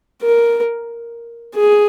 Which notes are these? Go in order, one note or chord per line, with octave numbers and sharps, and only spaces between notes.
A#4
G#4